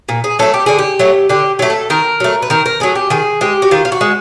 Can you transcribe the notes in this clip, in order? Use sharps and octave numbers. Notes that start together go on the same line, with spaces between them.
A#2
G#4
F#3 A3 A4
G4
D3 G#4
G4
F#3 A3
D3 G4
F#3 A3
A4
D#3 A#4
F#3 A3
B4
D#3 A#4
A#4
F#3 A3 G#4
G4
D#3 G#4
G#3 G4
F#4
D#3 F4
F4
F#4
G#3